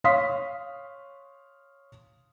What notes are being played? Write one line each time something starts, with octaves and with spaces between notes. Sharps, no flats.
C#5 F5 C6 D#6 B6